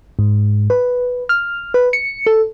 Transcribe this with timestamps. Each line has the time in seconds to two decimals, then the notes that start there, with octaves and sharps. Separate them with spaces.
0.19 G#2
0.70 B4
1.29 F6
1.74 B4
1.93 C#7
2.27 A4